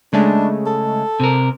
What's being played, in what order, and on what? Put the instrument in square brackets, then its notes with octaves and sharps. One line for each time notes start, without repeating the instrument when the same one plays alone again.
[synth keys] C#3 G#3 A3 [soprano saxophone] D4
[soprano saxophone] A4
[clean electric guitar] C3 A#4